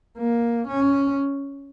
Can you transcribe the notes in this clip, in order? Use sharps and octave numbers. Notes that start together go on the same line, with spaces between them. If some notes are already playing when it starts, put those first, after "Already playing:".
A#3
C#4